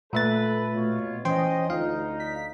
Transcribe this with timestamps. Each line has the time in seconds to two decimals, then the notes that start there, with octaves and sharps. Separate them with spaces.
0.13 A#2 A3 A4 B4 E5 A6
0.74 B2 F4 C#5
1.25 E3 C#4 C5 D#5 G5 C6
1.70 D2 D#4 F4 F5
2.20 B6